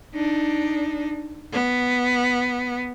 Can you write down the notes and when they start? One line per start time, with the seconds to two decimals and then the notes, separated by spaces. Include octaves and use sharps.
0.15 D4 D#4
1.52 B3